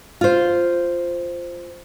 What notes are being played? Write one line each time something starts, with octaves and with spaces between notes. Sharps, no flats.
F4 C5